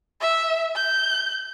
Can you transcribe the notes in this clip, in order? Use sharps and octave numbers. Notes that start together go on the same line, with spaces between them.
E5
G6